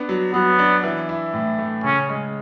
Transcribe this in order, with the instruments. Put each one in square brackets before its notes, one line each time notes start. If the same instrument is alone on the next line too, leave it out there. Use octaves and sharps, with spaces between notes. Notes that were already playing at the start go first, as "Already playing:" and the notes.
Already playing: [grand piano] B3 D4
F#3
[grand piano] F#3 [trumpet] B3
[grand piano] D4
E3
E4
A2
A3
[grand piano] C#3 [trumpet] C#4
[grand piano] G#3